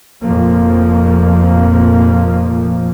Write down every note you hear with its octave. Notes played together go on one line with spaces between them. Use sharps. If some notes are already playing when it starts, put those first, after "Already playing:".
F1 F2 A#2 F3 A#3